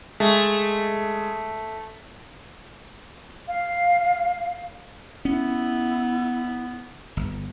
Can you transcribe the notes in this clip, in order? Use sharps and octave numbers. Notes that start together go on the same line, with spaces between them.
G#3 A3
F5
B3 C#4 E4
G1